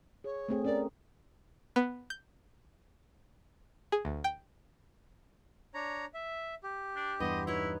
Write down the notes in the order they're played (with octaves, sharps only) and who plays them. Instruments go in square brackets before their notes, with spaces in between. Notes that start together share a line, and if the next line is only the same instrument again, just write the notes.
[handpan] G#4 [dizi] C#5
[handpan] A3 C4 G#4
[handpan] C#4 A#4 [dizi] D5
[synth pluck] B3
G6
G#4
D2
G5
[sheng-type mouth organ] D4 C#5 A#5
E5
G4
[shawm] D4
[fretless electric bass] E2 G2 [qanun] B3 C6 [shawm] D#5
[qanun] D#4 B4 C#5 [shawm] E4